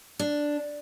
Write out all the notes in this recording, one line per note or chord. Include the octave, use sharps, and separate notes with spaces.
D4